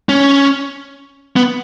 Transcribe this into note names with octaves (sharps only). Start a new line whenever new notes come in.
C#4
B3